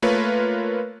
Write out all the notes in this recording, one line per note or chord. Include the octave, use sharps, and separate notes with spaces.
A3 A#3 F4 A#4 B4 C#5